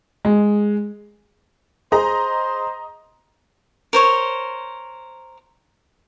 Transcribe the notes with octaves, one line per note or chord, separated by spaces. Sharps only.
G#3
G#4 C5 D#5 A#5
A#4 C5 C#5